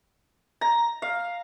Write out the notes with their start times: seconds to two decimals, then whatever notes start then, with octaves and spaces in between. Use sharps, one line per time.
0.61 A#5
1.02 F5